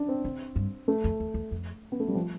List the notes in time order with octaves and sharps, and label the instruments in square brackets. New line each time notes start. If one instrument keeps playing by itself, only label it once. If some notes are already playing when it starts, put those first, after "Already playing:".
Already playing: [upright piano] D4
C4
[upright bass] D3
G2
[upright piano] A3
[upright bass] F2
E2
E2
F2
[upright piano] B3
A3
G3
F3